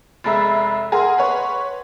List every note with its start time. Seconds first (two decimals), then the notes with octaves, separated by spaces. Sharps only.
0.24 F1 G#3 E5 A#5 B5 A6
0.92 G#4 A#4 F#5 C6
1.18 B4 C#5